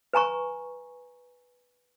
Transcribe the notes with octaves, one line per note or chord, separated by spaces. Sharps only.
B4 G#5 A#5 C#6